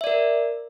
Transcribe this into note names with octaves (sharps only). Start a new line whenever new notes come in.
A#4 D5 E5